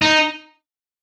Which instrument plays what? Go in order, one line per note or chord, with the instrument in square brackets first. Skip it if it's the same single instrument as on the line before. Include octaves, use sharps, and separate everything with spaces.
[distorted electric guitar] D#4